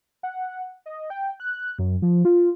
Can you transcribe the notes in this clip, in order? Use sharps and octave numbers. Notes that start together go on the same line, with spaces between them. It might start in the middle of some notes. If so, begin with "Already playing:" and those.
F#5
D#5
G5
F#6
F#2
F3
F4